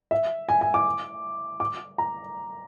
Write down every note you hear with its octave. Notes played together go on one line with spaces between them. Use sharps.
E5
G#5
G#5
D6
D6
A#5